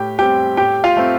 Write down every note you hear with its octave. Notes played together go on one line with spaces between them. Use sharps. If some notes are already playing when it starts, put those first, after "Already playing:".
Already playing: A2 G4 G5
G3 C4 G4 G5
A2 G4 G5
F4 F5
A3 C4